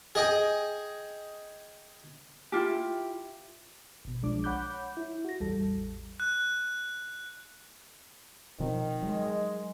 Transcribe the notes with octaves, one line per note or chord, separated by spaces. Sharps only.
G#4 D#5 G5 G#5
E4 F4 G4
G#1 B2
B1 F3 G#3 D4 D6
C#5 F#5 B5 D6 F#6 G6
E4
F#4 A#6
A1 E2 G3 A4
F#6
B2 D#3 F3 C4
F#3 G#3